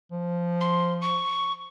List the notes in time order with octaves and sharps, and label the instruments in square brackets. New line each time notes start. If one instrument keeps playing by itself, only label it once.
[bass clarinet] F3
[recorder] C6
C#6